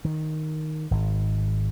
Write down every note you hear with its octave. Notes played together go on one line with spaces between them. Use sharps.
D#3
G#1